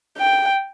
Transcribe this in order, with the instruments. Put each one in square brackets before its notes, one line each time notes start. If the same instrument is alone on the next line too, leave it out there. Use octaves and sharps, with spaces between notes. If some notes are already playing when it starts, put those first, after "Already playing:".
[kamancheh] G5